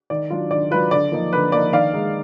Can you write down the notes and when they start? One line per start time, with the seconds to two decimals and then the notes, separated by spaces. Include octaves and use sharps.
0.10 D#3 D5
0.30 F#3 D4 F4
0.51 D#3 D5
0.71 F#3 D4 F4 B4
0.91 D3 D5
1.12 F3 A#3 D#4
1.33 D3 B4
1.52 F3 A#3 D#4 D5
1.73 D#3 D5 F5
1.93 G#3 D#4